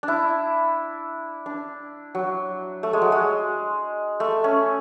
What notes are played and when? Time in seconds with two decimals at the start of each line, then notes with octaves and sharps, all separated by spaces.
0.03 D4
0.08 E4
1.46 D4
2.15 F#3
2.83 A3
2.93 G#3
3.02 F#3
3.12 G#3
4.20 A3
4.44 C#4